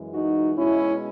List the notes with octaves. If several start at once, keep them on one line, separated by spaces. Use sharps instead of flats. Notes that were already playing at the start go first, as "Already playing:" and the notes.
Already playing: F#2 E3 G#3
D#4 F#4
B2 G#3 C#4 E4